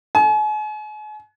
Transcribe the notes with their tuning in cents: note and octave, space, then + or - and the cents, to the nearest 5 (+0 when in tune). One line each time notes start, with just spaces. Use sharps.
G#5 +40